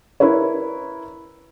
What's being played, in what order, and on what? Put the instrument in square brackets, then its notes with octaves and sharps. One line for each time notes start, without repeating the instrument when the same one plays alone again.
[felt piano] E4 A#4 B4 C#5